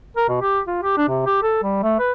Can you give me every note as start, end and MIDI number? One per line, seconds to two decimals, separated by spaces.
0.17 0.27 70
0.29 0.37 47
0.41 0.60 67
0.67 0.78 65
0.83 0.96 67
0.97 1.07 62
1.09 1.26 48
1.26 1.40 67
1.43 1.60 69
1.63 1.79 55
1.83 1.95 57
1.99 2.12 71